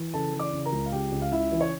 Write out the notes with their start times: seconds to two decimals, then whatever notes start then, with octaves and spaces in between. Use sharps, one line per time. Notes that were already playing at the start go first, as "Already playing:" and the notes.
Already playing: E3
0.13 C#3 A4 A5
0.33 E3
0.39 D5 D6
0.53 C#3
0.66 A#4 A#5
0.72 C#2
0.86 F5
0.92 C#3 G4 G5
1.12 C#2
1.22 F5
1.31 C#3 E4 E5
1.52 E3
1.61 C#5